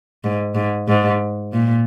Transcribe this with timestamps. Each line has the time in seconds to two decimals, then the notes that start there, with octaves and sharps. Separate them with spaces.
0.24 G#2
0.55 G#2
0.88 G#2
1.53 A#2